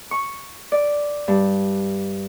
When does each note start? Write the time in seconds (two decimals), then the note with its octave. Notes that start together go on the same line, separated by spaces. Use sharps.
0.11 C#6
0.72 D5
1.28 G2